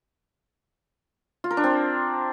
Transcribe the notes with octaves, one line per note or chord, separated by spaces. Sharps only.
F4
A#4
D4
C4